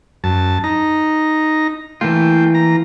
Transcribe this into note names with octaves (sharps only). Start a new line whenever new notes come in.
F#2 A5
D#4 A#5
E3 A3 A#3 F4 G5
A#5